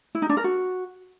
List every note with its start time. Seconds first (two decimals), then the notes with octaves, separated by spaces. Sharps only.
0.15 E4
0.22 D#4
0.29 D4
0.37 A#4
0.44 F#4